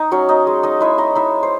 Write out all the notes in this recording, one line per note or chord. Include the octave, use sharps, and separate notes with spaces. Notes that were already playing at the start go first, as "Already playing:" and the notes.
Already playing: D#4 D#5
F#3 C#4 C#5
D#4 D#5
G#3
D#4 D#5
G#3 E4 E5
D#4 D#5
D#4 E4 E5
C5